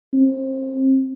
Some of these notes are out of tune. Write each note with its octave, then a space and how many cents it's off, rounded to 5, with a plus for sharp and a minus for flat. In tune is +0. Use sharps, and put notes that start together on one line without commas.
C4 +25